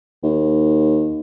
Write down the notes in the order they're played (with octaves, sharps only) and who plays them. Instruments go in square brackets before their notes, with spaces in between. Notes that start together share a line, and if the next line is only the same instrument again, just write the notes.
[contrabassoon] D#2